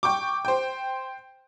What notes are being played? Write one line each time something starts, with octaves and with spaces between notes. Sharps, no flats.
G5 C#6 D6
C5 G5